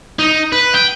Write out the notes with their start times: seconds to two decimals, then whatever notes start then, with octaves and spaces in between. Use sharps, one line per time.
0.19 D#4
0.52 B4
0.74 G5